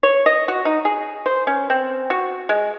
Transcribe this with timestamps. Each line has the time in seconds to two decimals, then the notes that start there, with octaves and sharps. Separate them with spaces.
0.03 C#5
0.26 D#5
0.48 F#4
0.65 D#4
0.85 G#4
1.26 C5
1.47 C#4
1.70 C4
2.10 F#4
2.49 G#3